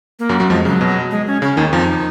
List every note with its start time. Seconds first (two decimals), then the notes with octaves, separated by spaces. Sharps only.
0.19 A#3
0.29 F#2 F#3
0.40 F#2 F#3
0.50 F2 F3 G#3
0.65 C#3 F#3
0.81 B2
1.11 G#3
1.27 C#4
1.42 C#3 C#4
1.57 D#2 D#3
1.72 F2 F3 D#4